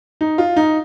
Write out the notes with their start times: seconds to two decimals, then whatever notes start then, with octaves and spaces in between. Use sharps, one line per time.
0.21 D#4
0.38 F4
0.56 D#4